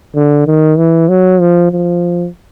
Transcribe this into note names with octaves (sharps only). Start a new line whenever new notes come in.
D3
D#3
E3
F#3
F3
F3